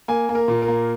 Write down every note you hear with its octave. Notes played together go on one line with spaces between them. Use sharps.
A#3 G#5
A#3
A#4
A#2
A#4
A#3